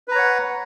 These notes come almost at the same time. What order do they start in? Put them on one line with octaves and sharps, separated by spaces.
B4 A#5 C#5 F#5